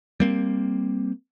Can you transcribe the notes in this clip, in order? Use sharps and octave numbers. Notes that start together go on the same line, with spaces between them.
G3 A#3 C4